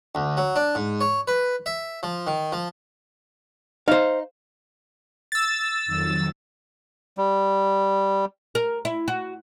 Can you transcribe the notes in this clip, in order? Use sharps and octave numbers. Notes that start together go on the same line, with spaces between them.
D2
F#3
D4
G#2
C#5
B4
E5
F3
D#3
F3
D#4 C5 F5
E6 A6
F2 D#3 F#3
G3
A#4
E4
F#4